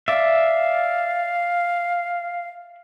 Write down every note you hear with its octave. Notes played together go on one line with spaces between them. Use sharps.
D5 E5 F5